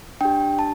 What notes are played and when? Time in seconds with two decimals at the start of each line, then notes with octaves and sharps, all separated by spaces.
0.21 D4 G4 G5
0.59 A5